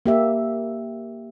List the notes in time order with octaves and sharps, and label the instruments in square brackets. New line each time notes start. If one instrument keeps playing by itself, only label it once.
[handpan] A#3 G4 E5